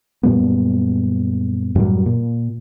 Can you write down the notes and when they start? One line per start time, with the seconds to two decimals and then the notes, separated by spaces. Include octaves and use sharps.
0.23 F#2 A#2 G3 B3
1.75 F#2 A2 F#3 G3
2.06 A#2